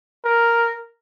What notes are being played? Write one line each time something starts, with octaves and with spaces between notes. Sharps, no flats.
A#4